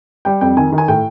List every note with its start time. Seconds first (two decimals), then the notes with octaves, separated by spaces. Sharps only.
0.25 G3 G5
0.41 F2 G5
0.57 D#3 G#5
0.72 D#3
0.78 G#5
0.88 A2 G5